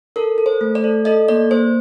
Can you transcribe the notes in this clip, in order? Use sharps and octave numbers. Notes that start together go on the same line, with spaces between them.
A4 A#4
A4
C5
A3
D5
A4
A4 D#5
A#3 D5
A#3 C5